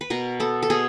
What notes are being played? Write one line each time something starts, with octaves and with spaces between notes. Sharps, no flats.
B4
B2 A#4
B3 A4
A4
B2 G#4